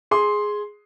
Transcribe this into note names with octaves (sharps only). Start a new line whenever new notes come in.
G#4 C6